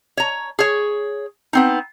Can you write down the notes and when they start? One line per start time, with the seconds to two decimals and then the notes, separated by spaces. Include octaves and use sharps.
0.17 C#5 A#5
0.59 G#4 C#5
1.53 B3 C4 D#4